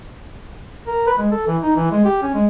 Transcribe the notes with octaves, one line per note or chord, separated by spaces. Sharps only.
A#4
B4
G#3
A4
E3
D#4
E3
G#3
G4
C#4
G#3